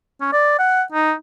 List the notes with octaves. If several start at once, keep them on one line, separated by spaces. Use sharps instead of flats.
C#4
D5
F#5
D#4